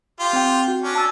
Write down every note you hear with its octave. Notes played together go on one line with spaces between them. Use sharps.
F4 G4
C4 G5
F#4
C#4 D4
A5 E6 A6